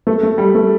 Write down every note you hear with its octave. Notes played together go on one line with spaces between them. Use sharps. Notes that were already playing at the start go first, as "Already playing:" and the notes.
A3
A3
G3
A3